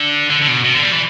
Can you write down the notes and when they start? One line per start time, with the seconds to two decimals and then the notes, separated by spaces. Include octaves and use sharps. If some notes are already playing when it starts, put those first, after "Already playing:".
Already playing: D3
0.30 D3
0.42 D3
0.48 B2
0.64 B2
0.74 D3
0.83 G3
0.92 E3